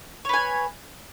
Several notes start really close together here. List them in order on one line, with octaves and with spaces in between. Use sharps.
C#5 B4 G#5